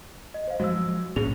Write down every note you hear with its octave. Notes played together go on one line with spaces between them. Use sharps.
D#5
C5 F5
F3 F#3 G#3 F#4 E6
C2 A2 C#4 G#4 F7